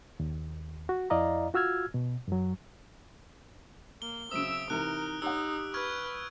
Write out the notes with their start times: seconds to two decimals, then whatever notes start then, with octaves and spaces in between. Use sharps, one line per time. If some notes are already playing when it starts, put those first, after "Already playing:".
0.20 D#2
0.89 F#4
1.10 F2 E4 D5 D#5 F5 A#5
1.54 F4 F#4 E6 F6 G#6
1.94 B2
2.28 F#2 F#3
4.02 A#3 G7
4.31 C#3 F#3 C4 E5 D#6 E6 D7
4.70 C3 E3 D#4 A#4 F#6
5.22 D#4 G4 C#5 F#5 E6
5.74 B4 C#6 F6 G#6